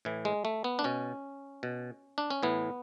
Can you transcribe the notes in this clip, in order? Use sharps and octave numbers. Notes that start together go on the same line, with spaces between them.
A2 E3
G#3
A3
B3
D4
B2 C#4
B2
D4
C#4
A2 E3 B3